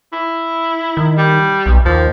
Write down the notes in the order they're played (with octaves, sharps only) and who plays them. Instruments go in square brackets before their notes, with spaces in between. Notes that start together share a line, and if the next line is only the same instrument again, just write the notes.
[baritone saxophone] E4
[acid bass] D#3
[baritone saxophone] G3
[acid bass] B1
[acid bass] D#2 [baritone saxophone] F3